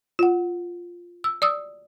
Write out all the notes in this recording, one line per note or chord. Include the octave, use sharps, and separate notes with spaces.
F4 F#5
E6
D5 D#6 E6